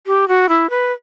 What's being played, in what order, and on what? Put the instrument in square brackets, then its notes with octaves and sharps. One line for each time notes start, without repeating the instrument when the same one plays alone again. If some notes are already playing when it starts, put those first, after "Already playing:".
[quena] G4
F#4
E4
B4